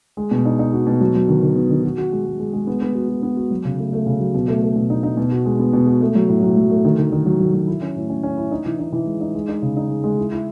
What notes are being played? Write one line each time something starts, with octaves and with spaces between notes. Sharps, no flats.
G#3
B2
D#4
D#4
F#4
B2
F#3
F#3
D#3
D#3
B3
D#3
F#4
F#4
G#3
G#3
G#3
G#3
B3
B3
F#4
F#4
B3
F#4
F#3
C#3
A3
A3
C#3
F#3
B2
A3
A3
B2
D#4
D#4
B2
F#4
G#3
B3
B2
F#4
A3
F#3
A2
F#3
F#3
A3
D#3
D#3
D#3
F#3
F#3
F#3
E4
C#4
A2
C#4
C#4
E4
D#4
E3
D#4
E3
G#3
D#4
G#3
D#4
C#3
D#4
G#3
G#3
E4
E4